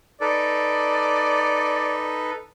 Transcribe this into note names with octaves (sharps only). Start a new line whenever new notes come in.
D#4 A4 B4 D5